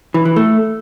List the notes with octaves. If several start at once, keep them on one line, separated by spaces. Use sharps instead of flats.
E3
E3
A3